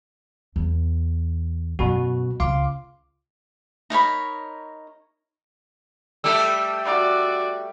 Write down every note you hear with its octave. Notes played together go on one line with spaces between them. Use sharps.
E2
F#2 B2 F#4
C#2 F5 C6 D6
D#4 A#4 C#5 B5
G3 A3 G4 E6
F#4 D5